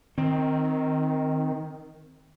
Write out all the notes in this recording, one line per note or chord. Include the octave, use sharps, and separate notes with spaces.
D#3 C4